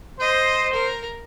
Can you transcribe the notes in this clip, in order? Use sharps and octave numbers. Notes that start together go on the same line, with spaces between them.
C5 D#5
A#4